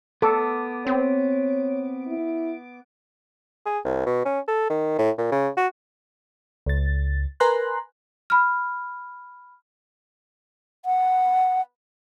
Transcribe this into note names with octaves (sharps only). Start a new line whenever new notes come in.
B3 A4 D6
C4 C#5
E4
G#4
C2
B2
C#4
A4
D#3
A2
A#2
C#3
F#4
C#2 A6
A#4 B4 G#5 A#5 C6 F#6
B5 F6
F#5